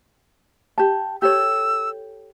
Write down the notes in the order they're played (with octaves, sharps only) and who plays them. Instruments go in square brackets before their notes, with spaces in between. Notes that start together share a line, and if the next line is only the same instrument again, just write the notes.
[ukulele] G4 A5
[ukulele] G4 A4 C#5 [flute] E6